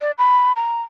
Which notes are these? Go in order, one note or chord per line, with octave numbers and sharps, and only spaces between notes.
D5
B5
A#5